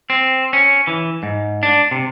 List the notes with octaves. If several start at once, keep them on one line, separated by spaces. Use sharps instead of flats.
C4
C#4
E3
G#2
D4
C3